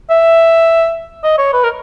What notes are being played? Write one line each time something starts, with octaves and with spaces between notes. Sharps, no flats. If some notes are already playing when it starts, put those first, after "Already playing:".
E5
D#5
C#5
B4
A#4